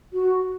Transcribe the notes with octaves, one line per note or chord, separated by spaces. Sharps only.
F#4